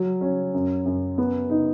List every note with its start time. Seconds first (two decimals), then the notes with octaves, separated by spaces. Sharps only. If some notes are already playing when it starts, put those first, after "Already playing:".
Already playing: F#3
0.21 C#4
0.54 F#2
0.86 F#2
1.18 B3
1.50 D#4